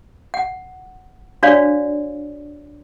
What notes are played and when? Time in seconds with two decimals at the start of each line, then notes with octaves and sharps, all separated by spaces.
0.34 F#5
1.43 D4 F#4 C#5 D5 F5